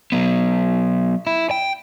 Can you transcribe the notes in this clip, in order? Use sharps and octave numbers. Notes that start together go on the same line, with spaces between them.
F#3 B3
E4
G5